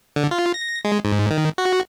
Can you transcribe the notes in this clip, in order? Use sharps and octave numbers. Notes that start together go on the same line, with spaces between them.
D3
F4
A#6
G#3
G#2
D#3
F#4